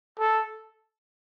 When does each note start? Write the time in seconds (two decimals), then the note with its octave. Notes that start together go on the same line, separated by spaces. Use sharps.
0.19 A4